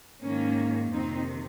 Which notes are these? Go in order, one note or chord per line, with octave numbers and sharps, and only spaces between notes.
G#2 D#3 A#3 C#4
F2 C3 D#3 C4 D#4